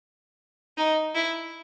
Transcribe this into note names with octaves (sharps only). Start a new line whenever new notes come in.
D#4
E4